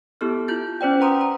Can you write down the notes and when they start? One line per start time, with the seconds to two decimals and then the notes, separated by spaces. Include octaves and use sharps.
0.21 B3 E4 G4 A4 F6
0.48 E4 F4 G6 A6
0.81 C#4 C5 D5 G5
1.00 B4 F#5 A#5 C6 D#6
1.21 A#5